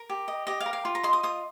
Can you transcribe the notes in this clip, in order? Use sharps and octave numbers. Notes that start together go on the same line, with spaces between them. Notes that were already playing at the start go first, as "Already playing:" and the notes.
Already playing: A#4
G4
D#5
G4 D#5
F5
A#4
F5
F4
A#5
D#5 C6
D#6
F4 D#6